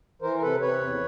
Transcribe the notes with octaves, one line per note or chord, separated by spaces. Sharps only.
E3 A#4 C5
A#4
C3 A4 B4
C3 B4 C#5
E2